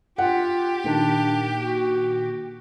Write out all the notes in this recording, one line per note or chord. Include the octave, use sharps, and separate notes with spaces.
F4 G4 F#5
A#2 D#3 A#3 D4
F#4